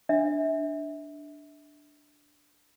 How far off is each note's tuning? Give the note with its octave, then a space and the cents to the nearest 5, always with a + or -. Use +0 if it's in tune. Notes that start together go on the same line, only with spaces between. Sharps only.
D4 +0 E5 -25